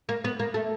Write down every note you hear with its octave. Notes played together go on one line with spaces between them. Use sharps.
A#3
B3
A#3
A3